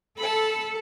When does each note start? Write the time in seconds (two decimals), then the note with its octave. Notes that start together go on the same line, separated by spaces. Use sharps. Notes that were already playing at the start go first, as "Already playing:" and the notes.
0.18 A4 A5 B5